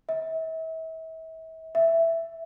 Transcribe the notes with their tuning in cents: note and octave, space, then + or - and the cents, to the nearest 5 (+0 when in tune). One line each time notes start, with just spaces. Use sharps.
E5 -35
E5 +5